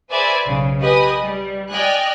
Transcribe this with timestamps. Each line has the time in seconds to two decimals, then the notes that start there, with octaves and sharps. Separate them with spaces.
0.11 G#4 B4 C5 D5 E5 G#5
0.46 B1 C#3
0.80 G4 B4 D#5 G#5 D#6
1.22 G3
1.70 D5 D#5 G5 G#5 F6 F#6